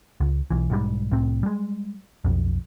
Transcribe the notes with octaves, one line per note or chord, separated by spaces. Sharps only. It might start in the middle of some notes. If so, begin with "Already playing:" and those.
C#2
B1 E3
B1 G#2 G3
C2 A2 C4
G3 G#3
B1 F2